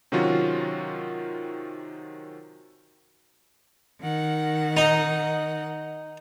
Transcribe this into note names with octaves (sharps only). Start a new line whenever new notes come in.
C3 D#3 F#3 C#4 F4 F#4
D#3 F#5
D#4